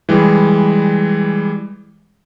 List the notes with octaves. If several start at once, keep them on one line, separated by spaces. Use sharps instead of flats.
E3 G3 G#3